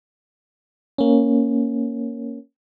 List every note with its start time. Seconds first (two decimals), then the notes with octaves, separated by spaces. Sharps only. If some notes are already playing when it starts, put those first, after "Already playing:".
0.98 A#3 C#4